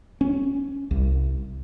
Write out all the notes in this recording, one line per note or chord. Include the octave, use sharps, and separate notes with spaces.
C#4
C2